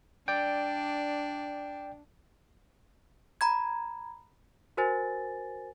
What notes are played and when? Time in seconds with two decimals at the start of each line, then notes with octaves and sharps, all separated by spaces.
0.28 D4 D5 G5
3.41 A#5 B5 G#6
4.77 F#4 A#4 C5 G#5 A6